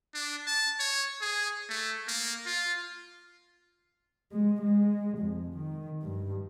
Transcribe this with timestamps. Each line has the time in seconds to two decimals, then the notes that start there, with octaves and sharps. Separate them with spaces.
0.14 D4
0.47 A5
0.79 C#5
1.21 G#4
1.69 A3
2.08 A#3
2.46 F4
4.32 G#3
4.62 G#3
5.18 F2
5.56 D#3
6.02 G2